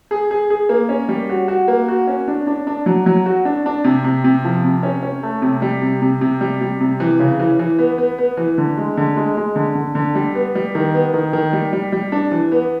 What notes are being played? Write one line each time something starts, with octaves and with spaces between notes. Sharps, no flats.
G#4
G#4
G#4
A#3
C#4
G3
F#4
F#4
A#3
F#4
C#4
D4
D4
D4
F#3
F#3
F#4
D4
D4
C3
C3
C3
F3
C3
C#4
C#4
A3
C3
G3
C3
C3
C3
G3
G3
C3
E3
C#3
E3
E3
B3
B3
B3
E3
D3
G#3
D3
G#3
G#3
D3
D3
D3
G3
B3
G3
D#3
B3
D#3
D#3
G3
G3
G3
D4
E3
B3